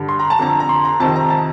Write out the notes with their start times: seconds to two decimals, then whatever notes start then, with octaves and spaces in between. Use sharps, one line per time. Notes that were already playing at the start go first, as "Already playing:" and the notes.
Already playing: G2 D3
0.09 C6
0.19 A#5
0.30 A5
0.39 F2 D3 A#5
0.60 A#5
0.69 C6
0.85 A#5
1.00 F2 C3 D#3 A5
1.16 A#5
1.30 A5